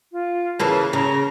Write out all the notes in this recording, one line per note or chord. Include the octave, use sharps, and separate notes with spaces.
F4
C#3 E3 A#3 A5
C#3 A#5